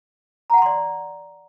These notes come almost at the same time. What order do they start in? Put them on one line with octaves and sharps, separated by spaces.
A#5 F#5 A5 C6 D5